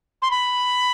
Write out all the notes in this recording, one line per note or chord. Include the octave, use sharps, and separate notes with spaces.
C6
B5